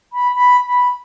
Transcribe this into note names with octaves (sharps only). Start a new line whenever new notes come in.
B5
B5
B5